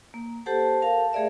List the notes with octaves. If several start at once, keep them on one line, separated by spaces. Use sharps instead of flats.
A#3
G4 A4 C5 F#5 A5
A#4 F5 A5
A3 G#4 A#4 D5 E5